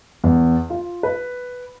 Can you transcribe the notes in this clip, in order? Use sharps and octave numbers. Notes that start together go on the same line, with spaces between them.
E2
F4
B4